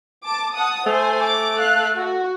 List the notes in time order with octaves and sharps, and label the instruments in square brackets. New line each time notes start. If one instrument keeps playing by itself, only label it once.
[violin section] A5 D6
F#5 A5 D#6
[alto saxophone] A3 [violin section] C5 G#5
[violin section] D6
A4 F5 F#6
F#4